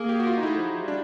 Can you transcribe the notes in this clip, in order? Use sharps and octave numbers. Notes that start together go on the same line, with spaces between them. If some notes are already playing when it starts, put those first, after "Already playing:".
Already playing: A#3 G#4
G4
F#4
F4
D#4
A3 E4
F3
F3
G3
D4